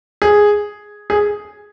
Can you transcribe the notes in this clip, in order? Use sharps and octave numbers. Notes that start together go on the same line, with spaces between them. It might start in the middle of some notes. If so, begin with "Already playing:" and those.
G#4
G#4